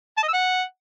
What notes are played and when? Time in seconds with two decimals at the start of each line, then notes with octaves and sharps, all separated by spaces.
0.17 A5
0.23 D#5
0.28 E6
0.33 F#5